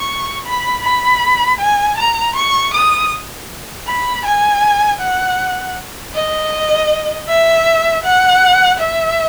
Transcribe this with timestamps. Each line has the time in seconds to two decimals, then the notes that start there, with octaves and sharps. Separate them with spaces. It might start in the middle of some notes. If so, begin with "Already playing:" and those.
Already playing: C#6
0.46 B5
0.83 B5
1.59 G#5
1.97 A#5
2.36 C#6
2.73 D#6
3.87 B5
4.25 G#5
5.00 F#5
6.14 D#5
7.29 E5
8.04 F#5
8.79 E5